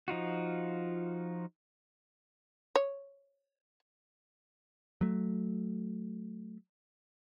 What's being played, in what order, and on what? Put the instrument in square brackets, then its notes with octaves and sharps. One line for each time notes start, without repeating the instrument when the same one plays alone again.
[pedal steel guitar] F3 D#4 F4 F#4
[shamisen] C#5
[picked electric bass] F#3 A3